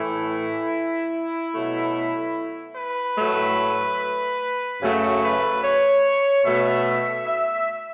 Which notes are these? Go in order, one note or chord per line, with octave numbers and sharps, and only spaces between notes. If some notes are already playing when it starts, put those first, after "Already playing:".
Already playing: A2 E3 A3 E4
B2 F#3 A3
B4
A2 F#3 A3
F#2 C#3 F#3 A3 F#4
B4
C#5
B2 A3 E5
E5